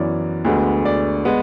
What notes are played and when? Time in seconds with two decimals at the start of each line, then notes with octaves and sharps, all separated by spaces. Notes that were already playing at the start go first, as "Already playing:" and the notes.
Already playing: F#2 E3 B3 C#5 D5
0.45 D2 D3 G#3 B3
0.85 D5
1.25 G#3 B3